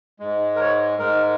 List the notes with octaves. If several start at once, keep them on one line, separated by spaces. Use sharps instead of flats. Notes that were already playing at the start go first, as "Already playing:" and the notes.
G#2 G#3
A#4
C#5
G#2 G#3 A#4